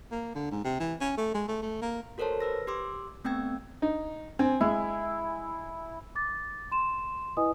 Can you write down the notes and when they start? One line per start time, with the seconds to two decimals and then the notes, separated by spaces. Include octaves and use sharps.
0.12 A#3
0.35 D3
0.51 G#2
0.64 C3
0.80 E3
1.01 C#4
1.17 A3
1.34 G#3
1.48 A3
1.62 A3
1.82 A#3
2.18 F#4 A4 A#4 C5 C#5 A5
2.40 B4 E6 A#6
2.67 G4 C6 D6 E6
3.25 A3 B3 C4 G5 E6 G#6
3.82 D#4
4.39 C4 G#5
4.61 G#3 E4
6.15 D6 A6
6.72 C6 E7
7.37 E4 B4 D#5 G#5 D#6